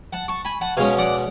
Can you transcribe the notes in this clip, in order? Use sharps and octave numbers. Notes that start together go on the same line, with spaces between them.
F#5 A5
A5 C#6
G#5 B5
F#5 A5
B2 G#3 C#4 F5 G#5
D5 F#5